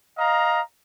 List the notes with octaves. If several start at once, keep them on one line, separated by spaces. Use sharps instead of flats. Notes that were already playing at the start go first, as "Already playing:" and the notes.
D#5 F5 A#5